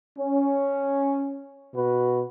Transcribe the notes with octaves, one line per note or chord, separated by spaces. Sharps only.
C#4
B2 F#4 B4